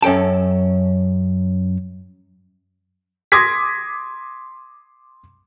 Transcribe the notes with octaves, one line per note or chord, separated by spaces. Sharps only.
F#2 C#4 A4 G5 A5
C6 D6 D#6 G#6 A#6 B6